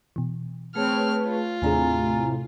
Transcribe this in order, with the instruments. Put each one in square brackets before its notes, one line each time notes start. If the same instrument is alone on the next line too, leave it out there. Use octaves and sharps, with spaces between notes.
[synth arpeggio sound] B2 E3
[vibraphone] A3 G#4 A5 [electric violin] C4 F6 [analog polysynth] B4 C#5
[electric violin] F4
[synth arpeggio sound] D#2 D4 G#4 [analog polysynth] A2 C3 [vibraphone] G#5 A#5